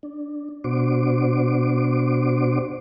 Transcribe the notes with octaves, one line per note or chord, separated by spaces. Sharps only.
D4
B2 D4 F#4 C5 D6